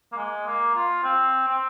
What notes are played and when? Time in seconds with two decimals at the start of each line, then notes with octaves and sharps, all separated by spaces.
0.12 A#3
0.17 G#3
0.47 A#3
0.75 F4
1.04 C4
1.49 C4